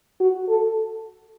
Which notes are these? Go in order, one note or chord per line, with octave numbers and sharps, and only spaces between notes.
F#4
A4